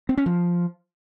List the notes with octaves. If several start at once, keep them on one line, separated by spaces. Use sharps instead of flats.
C4
C#4
F3